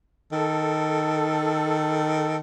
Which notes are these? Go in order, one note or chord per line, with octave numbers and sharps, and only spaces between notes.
D#3 A4